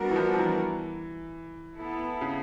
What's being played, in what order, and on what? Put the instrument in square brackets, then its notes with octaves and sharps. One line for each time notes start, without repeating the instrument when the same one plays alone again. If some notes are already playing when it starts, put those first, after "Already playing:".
Already playing: [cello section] G3 B3 D4 F#4 A#4
[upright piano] E3
F3
F3
E3
[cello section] B3 E4 A4
[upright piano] C#3